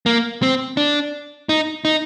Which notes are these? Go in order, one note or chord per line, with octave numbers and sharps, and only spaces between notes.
A#3
C4
D4
D#4
D#4